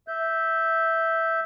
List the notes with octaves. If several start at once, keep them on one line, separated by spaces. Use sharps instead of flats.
E5 G6